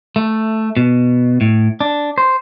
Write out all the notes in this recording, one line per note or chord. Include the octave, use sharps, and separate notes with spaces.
A3
B2
A2
D4
C5